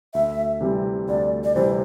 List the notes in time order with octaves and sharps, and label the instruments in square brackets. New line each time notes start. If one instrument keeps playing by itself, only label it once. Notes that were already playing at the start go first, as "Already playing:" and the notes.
[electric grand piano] D2 [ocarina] E5
[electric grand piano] C3 E3 G3 C4
[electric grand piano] D2 [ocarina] D5
[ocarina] D5
[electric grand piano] C3 E3 G3 C4 [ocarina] C5